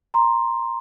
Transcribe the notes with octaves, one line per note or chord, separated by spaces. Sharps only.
A#5 C6